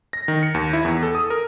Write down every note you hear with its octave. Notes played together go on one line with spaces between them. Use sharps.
A#6
D#3
C#7
D#2
E4
E2
A4
D#6
A#4